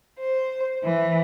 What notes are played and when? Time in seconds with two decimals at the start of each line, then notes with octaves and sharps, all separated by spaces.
0.19 C5
0.84 E3